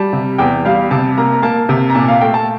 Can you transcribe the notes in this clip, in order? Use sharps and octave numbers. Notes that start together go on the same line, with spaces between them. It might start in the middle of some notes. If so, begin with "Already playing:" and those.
Already playing: G3 A5
C3
E2 G5
G3 F5
C3 A5
A#3 A#5
A#5
A#3 A5
C3
A#5
A#2 A5
F5
A3 G5
A5